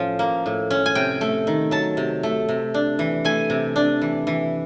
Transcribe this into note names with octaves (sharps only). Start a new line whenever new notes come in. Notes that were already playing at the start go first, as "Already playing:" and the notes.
Already playing: A2 F3 C#4
A#3
A2
C#4
G#5
C3 G5
A3
D#3
F#3 A5
C3
A3
C3
D4
E3
A3 G#5
C3
D4
E3
E3